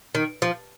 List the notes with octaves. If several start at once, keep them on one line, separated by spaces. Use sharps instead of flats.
D#3
F3